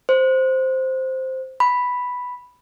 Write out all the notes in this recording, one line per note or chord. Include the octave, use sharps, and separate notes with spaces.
C5
B5